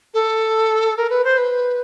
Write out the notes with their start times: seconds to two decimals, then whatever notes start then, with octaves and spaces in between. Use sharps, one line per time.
0.14 A4
0.97 A#4
1.10 B4
1.24 C5
1.38 B4